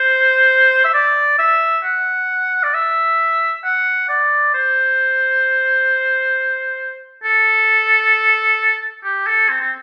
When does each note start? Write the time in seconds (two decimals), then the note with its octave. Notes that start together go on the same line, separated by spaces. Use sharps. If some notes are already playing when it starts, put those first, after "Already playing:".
Already playing: C5
0.84 E5
0.94 D5
1.38 E5
1.84 F#5
2.63 D5
2.74 E5
3.64 F#5
4.09 D5
4.54 C5
7.24 A4
9.04 G4
9.27 A4
9.49 C4
9.61 C4